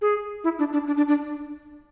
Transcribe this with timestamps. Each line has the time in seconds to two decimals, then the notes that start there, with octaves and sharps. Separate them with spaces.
0.02 G#4
0.44 E4
0.59 D4
0.73 D4
0.87 D4
0.97 D4
1.08 D4